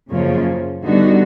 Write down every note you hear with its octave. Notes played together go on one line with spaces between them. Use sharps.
F#2 C#3 F3 A#3 C#4
D3 G3 B3 D#4 F#4